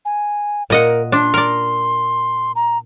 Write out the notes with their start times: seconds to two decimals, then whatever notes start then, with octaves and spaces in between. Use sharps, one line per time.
0.05 G#5
0.70 A#2 A#4 D#5 F#5
1.12 D4 C6
1.34 A#4 D5
2.56 A#5